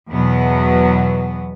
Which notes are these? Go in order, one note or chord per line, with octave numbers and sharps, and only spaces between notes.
E2 B2 F#3 B3